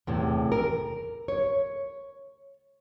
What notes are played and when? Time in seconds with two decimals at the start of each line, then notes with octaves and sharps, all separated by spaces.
0.07 E2 A2 C3
0.52 A#4
1.28 C#5